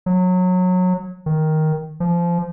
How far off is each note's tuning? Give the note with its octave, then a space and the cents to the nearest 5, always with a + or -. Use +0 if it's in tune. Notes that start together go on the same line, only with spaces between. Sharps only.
F#3 -20
D#3 +5
F3 -20